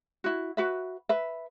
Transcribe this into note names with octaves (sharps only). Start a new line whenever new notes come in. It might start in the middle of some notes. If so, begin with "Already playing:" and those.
E4 F#4
F#4 B4 E5
B4 E5